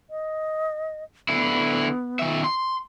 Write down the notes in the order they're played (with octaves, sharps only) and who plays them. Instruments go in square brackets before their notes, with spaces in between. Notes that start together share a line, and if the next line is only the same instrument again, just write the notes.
[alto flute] D#5
[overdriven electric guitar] D3 E4 [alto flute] B3
[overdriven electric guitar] D#3 E5
C6